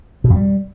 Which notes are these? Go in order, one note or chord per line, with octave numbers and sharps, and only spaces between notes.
B2
F2
G3